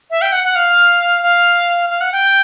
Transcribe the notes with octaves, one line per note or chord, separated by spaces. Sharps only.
E5
G5
F#5
F#5
F5
F5
F5
F#5
G5